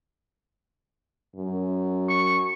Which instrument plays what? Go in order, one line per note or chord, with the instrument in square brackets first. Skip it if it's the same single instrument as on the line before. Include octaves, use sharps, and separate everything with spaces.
[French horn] F#2
[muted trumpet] C#6